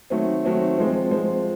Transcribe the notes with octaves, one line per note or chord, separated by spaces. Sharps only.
D#3 F#3 A3 C4
D#3 F#3 A3 C4
F3 G#3 C4
F3 G#3 C4